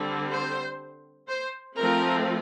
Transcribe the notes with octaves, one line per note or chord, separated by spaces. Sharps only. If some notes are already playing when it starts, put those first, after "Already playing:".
Already playing: D3 G3 C4
C5
C5
F3 A3 C4 A#4